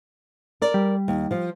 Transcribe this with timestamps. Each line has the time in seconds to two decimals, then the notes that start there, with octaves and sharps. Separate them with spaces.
0.62 A#4 D5
0.74 G3
1.08 D#2
1.31 F3 F4